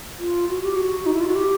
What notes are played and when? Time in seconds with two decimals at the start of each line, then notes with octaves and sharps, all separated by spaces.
0.19 F4
0.49 F#4
0.63 G4
0.76 F#4
1.06 D#4
1.14 E4
1.21 F4
1.28 F#4
1.35 G4